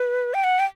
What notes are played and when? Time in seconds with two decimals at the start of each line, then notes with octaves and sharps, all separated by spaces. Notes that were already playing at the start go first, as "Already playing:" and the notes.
Already playing: B4
0.34 G5
0.44 F#5
0.59 G5